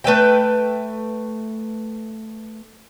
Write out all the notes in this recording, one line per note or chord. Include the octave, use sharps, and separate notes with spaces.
A3 B4 E5 G5